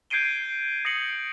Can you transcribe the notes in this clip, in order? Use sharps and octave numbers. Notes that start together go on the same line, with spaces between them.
G6 G#6 C7 D7 D#7 G7
D#6 A#6 C7 C#7 F#7